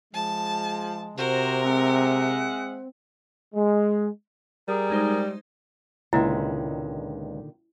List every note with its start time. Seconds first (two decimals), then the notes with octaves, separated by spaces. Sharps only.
0.14 F3 G#3 A5
1.17 C3 F#4 A#4 C5
1.63 G#3 C4 E5 F#5
3.55 G#3
4.68 G3 G#4 A#4
4.90 G#3 D#4 C5
6.13 C#2 A#2 D3 D#3 G#3 E4 E5